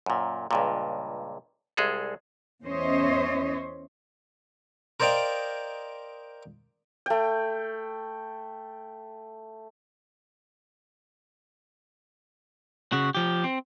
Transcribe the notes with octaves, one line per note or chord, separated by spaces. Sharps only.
F#2 A#2
C#2 G2 A#2
C2 G#3 G#4 A4
E2 C#4 C5 C#5 D#5 E5
A#4 C5 D5 D#5 F5 G5
A3 G5
C#3 F#4
F3 G4
C4